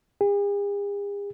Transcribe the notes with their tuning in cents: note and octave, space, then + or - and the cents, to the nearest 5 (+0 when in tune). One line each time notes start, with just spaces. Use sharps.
G#4 -45